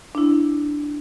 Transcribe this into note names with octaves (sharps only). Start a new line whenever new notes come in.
D4 E4